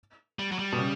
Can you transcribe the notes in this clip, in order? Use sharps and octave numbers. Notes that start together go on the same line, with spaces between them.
G3
F#3
G3
B2
C#3